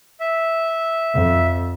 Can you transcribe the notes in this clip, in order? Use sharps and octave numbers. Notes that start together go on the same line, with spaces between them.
E5
F2